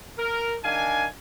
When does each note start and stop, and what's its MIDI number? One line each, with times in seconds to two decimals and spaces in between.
0.18 0.56 70
0.64 1.06 51
0.64 1.06 62
0.64 1.06 77
0.64 1.06 80